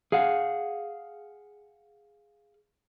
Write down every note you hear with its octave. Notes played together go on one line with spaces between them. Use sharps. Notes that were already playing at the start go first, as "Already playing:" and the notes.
G#4 F5 F#5